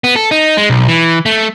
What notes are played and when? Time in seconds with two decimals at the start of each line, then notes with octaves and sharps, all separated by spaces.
0.04 B3
0.16 A4
0.31 D#4
0.57 G#3
0.70 B1
0.88 E3
1.26 A3